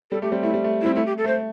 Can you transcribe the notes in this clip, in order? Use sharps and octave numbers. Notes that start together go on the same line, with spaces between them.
G3 A4
A3 G4
G3 C4
A3 E4
G3
A3
G3 C4 E4
A3 E4
G4
A4
A3
C5